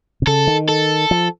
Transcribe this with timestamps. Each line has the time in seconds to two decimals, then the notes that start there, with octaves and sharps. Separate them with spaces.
0.22 C3
0.27 C#3 A4
0.47 D#3
0.69 A4
1.11 F3